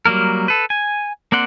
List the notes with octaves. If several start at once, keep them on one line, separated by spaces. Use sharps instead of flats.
F#3 G3 A#3 A#4
A4 B4
G#5
A#3 C4 D5 F#5 C6